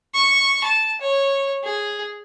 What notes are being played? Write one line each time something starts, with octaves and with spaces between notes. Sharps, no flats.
C#6
A5
C#5
G#4